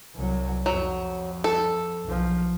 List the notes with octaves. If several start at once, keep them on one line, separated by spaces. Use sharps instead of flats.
C2 F#3
F2 F#3
A4
B1 F3